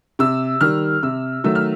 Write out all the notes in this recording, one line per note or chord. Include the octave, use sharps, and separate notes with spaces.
C3 E6
D#3 G3 F6
C3 E6
D#3 F#3 A3 E6
F6